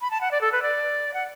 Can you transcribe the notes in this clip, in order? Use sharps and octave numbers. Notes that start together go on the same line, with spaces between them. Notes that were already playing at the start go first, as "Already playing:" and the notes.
B5
A5
F#5
D5
A4
B4
D5
F#5